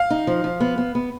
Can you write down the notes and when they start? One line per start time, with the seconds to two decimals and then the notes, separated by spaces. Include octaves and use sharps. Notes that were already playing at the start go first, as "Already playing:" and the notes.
Already playing: F5
0.10 D#4
0.27 F3
0.44 F3
0.60 B3
0.78 B3
0.95 B3